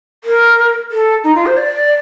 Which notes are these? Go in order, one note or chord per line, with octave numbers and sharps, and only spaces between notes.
A#4
A4
D#4
F4
C5
D5